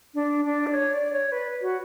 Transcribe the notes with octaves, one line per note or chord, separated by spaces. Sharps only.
D4
D4
D5
C#5
D5
C#5
B4
F#4